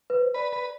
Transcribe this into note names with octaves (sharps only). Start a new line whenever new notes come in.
B4
C5
B4 D5
B4